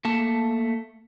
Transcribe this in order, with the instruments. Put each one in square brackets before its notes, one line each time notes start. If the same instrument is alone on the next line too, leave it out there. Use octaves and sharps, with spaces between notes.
[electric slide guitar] A3 A#3 A5